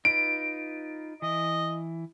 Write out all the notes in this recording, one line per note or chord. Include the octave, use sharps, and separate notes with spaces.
D#4 F4 B4 D7
E3 D#5